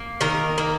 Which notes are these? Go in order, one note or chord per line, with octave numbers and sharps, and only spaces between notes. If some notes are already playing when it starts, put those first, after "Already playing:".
Already playing: A#3
D#3 A#4
A#3